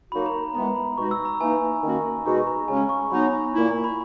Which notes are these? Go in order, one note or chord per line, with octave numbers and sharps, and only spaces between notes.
F#3 A#3 D#4 F#4 B5
A#5
E3 G#3 B3 A#5
B5
B2 G#3 D#4 F#4 C#6
E6
A#5
E3 A#3 D#4 G#5
D#3 A#3 C#4 F#4
B2 G#3 D#4 F#4 C#6
A#5
C#3 G#3 C#4 G#5
C#6
F#3 B3 D#4 B5
A#2 A#3 E4
B5